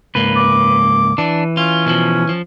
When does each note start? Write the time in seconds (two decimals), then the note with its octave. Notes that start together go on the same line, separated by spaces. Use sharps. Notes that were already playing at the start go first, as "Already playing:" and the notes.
0.15 C#2 G#2 A#3 B4
0.36 D6
1.18 E3 D4
1.57 C#4 F4
1.86 B2 D#3 F3
2.29 F3